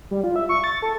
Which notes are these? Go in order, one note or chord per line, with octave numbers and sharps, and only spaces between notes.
G3
F4
E5
C#6
A6
A4